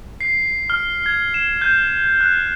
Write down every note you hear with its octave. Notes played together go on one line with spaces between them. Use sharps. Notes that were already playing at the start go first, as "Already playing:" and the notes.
C7
F6
G#6
E7
G6
F#6